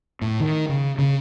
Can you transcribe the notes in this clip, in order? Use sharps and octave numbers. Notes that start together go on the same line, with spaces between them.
A2
D#3
C#3
C#3